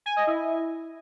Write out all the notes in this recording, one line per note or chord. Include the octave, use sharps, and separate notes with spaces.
G#5
D#5
E4